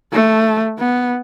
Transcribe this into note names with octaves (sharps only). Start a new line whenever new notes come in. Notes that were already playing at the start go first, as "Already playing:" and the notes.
A3
B3